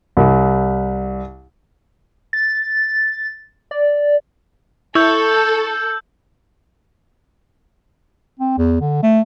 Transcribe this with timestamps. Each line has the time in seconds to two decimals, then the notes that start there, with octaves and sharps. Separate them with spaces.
0.17 C2
2.33 A6
3.71 D5
4.95 E4 A4 C#5 E6 G6
8.40 C4
8.58 E2
8.81 D3
9.03 A3